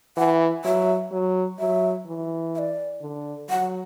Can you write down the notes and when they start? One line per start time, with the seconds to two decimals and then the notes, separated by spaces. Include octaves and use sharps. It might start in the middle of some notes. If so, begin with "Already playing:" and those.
0.17 E3 F#5
0.65 F#3 E5
1.12 F#3
1.59 F#3 E5
2.06 E3
2.55 E5
2.59 D5
3.01 D3
3.49 F#3 F#5